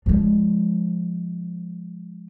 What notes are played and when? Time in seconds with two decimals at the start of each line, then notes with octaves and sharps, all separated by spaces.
0.06 F3 G#3